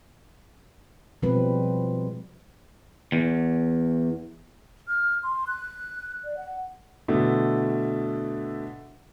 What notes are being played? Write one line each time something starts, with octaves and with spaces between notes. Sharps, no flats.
B2 F3 G3 G#3 C4 B4
E2
F6
C6
F#6
D5
F#5
B2 D3 A3 E4